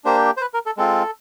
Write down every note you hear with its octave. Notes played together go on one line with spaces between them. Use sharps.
A#3 D4 G4 C5
C5
B4
A#4
A4
G#3 C4 F4 A4